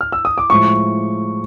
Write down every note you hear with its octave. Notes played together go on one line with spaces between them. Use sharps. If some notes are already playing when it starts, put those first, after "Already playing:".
F6
E6
D#6
D6
A2 F3 G#3 C#6